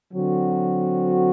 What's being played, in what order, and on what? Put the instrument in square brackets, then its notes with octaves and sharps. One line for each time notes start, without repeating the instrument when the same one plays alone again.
[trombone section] D3 F#3 C4 F#4